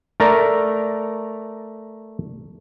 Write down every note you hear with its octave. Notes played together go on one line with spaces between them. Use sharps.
A3 A#4 D5 A#5